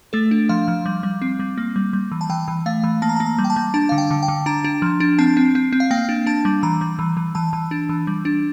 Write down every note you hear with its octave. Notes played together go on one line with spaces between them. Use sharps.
A3 A4
D4
F3 F5
F3
G3
G3
C4
G3
A#3
G3
G3
E3
A5
E3 G5
E3
A3 F5
E3
A#3 A5
A#5
A5
A#3
A#5
G3
G5
A5
G3
D4 A5
D3 F5
G5
D3
G5
D3
D4 A#5
D4
F3
D4
C4 A5
C4
C4
C4
F5
A#3 G5
D4
D4 A5
G3
E3 A#5
G3
E3
E3
E3 A5
E3
D4
E3
G3
D4